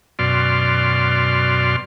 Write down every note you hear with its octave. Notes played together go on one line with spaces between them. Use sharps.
F#2 B2 D5 C6 F6